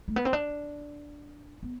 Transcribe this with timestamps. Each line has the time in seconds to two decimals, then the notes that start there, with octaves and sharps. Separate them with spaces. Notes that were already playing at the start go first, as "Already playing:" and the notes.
0.08 A3
0.16 B3
0.25 C4
0.33 D4
1.63 B3